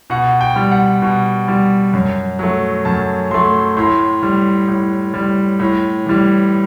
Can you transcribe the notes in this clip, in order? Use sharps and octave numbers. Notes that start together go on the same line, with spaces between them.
B2 F#5
G5
G3
F#5
B2
G3
F#2
F#3 A3
F#2 A5
F#3 A3 C6
A2 C6
G3
A2
G3
A2
E3 G3